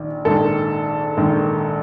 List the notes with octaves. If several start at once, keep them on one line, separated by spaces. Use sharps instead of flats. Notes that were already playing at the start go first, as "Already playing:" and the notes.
Already playing: A#1 D#3
A#1 G#2 D#3 A4
A#1 G#2 D#3